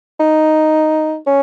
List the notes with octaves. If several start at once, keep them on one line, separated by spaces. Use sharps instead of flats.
D#4
C#4